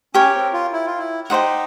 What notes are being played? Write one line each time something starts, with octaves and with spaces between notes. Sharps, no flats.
C#4 G4 A#4 C#5
C4
F4
E4
F4
E4
D#4 G4 C5 D#5 F#5